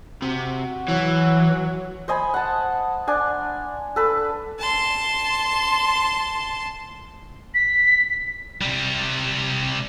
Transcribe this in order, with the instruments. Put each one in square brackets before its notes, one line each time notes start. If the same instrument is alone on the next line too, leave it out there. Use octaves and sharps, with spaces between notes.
[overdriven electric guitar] C3 [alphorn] F#4
[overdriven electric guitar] E3 [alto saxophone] F#3
[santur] C5 D#5 G#5 B5
F#5 A5
D4 G#5
A4 B4
[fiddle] A5 C6
[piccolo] B6
[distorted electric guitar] C3 G3